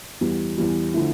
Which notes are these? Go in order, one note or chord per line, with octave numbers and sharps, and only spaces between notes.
E2 E3 G3
E2 E3 G3
D3 F3 A3 E4